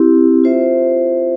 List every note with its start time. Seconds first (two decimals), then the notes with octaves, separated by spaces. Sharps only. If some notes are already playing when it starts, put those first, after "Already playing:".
Already playing: C4 E4 G4
0.44 F4 C5 E5